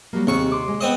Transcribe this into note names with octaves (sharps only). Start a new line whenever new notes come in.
F#3 G3 A#3
D#2 C3 C4 G#4 C#6
C6 D6
G#3
B3 C4 D#5